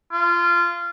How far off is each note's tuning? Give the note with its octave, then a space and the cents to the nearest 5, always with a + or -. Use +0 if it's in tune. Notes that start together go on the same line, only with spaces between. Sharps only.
F4 -20